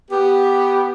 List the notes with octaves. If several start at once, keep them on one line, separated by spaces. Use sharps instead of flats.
B3 G4